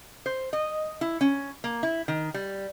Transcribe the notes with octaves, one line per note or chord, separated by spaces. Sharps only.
C5
D#5
E4
C#4
A#3
E4
D#3
G3